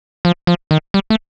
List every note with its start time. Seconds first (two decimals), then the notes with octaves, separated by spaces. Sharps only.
0.25 F3
0.47 F3
0.71 D#3
0.94 G3
1.10 A3